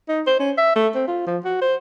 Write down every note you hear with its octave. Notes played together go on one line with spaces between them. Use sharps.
D#4
C5
C#4
E5
A3
C4
F4
F3
F#4
C5